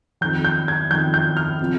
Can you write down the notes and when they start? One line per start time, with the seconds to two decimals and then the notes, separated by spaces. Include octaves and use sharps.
0.21 F2 D#3 G6
0.44 G6
0.68 G#6
0.91 F2 D#3 G6
1.14 G6
1.37 F6
1.61 C3 F3